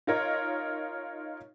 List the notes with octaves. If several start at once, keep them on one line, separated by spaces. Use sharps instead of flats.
D#4 F4 A#4 C#5 D#5